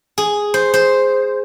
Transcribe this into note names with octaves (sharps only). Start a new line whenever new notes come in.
G#4
C5
C5